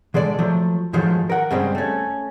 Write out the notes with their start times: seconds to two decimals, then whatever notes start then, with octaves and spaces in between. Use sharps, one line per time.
0.14 D3 G#3 A4 D5
0.39 F3 F#3 A3
0.93 G#2 D#3 F3 F#3 G#3 A3
1.30 A#4 F#5
1.51 G2 C#3 G3 G#3 C4
1.75 A3 C#4